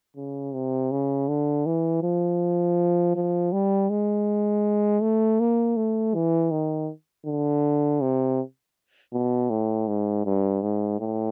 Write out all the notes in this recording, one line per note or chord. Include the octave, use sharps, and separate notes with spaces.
C#3
C3
C#3
D3
E3
F3
F3
G3
G#3
A3
A#3
A3
E3
D#3
D3
C3
B2
A2
G#2
G2
G#2
A2